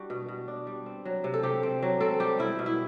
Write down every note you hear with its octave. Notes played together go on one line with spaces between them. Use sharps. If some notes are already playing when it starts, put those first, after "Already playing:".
Already playing: G3 D4 F#4
B2
B2
D4
G3
C4
F#3
C3
A4
C3 G4
C4
F#3
C4 A4
G3 G4
B2 E4
B2
E4